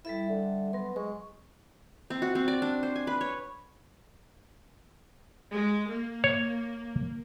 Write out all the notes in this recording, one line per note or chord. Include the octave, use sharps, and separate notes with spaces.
G3 E4 A4 E5
D3
F#3 B3 C6
G#3 C#6
C4
F#4
C4
D5
D4
C5
G#5
B4
C#5
G#3
A#3
C#5